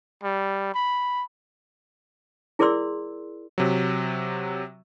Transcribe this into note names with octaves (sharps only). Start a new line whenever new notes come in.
G3
B5
E4 G#4 A#4 D5 C6 E6
C3 F#3